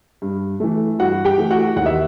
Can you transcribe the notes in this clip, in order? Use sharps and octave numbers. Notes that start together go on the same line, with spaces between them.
G2
E3 A3
G2 F#4 F#5
G4 G5
E3 A3
F#4 F#5
D#2 F#5
E5